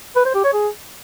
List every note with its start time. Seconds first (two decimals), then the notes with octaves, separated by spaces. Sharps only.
0.16 B4
0.25 C5
0.35 G4
0.44 C#5
0.53 G#4